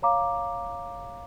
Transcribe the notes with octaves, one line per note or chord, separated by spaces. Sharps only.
C#5 F5 A#5 D6